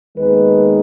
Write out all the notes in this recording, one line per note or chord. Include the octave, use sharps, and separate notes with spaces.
D#2 D#3 G#3 B3 B4